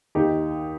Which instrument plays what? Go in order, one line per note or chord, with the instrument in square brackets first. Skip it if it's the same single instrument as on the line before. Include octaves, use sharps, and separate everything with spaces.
[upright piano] D#2 D#4 G4